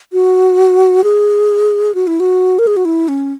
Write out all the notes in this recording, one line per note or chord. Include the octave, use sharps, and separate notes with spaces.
F#4
G#4
F#4
E4
F#4
A#4
G#4
F#4
E4
C#4